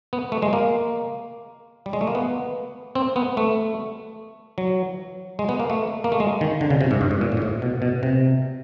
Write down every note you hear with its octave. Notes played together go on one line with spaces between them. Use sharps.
B3
A3
G#3
A#3
G3
G#3
A3
A#3
B3
C4
B3
A3
F#3
G#3
B3
A#3
A3
A#3
A3
G#3
D#3
D3
C#3
C3
G#2
G2
G#2
A#2
A2
G#2
A2
B2
B2
C3